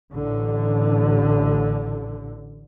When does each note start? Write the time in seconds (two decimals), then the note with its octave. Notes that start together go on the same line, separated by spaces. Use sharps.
0.13 A1 D3